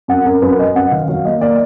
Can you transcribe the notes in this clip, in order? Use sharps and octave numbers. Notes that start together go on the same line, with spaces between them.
F#2 F#5
F#2 A#4
F#2 B4
F#3 D#5
F#2 F#5
D#3 F5
F#3 F5
A#3 D#5
A#3 D5